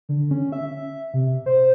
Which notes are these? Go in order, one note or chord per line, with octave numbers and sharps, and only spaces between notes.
D3
C#4
E5
C3
C5